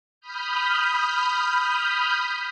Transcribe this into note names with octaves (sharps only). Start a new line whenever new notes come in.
B5 D#6 F6 G6